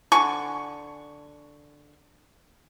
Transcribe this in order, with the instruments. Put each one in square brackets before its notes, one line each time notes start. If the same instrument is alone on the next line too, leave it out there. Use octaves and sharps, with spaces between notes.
[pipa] D3 G#5 C#6